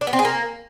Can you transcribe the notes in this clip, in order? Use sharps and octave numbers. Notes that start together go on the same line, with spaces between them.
D4
B3
C4
G#4
A#3